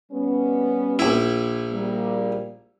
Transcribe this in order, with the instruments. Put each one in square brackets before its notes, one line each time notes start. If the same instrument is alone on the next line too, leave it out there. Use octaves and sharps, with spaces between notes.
[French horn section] G3 B3 C#4
[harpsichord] A#1 E4
[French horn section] G3 A#3